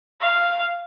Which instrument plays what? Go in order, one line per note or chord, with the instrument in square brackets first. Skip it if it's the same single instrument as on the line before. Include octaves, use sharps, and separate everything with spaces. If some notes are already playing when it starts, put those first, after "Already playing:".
[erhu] F5